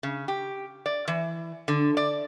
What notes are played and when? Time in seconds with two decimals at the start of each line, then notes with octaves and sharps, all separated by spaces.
0.03 C#3
0.28 G4
0.86 D5
1.08 E3
1.68 D3
1.97 D5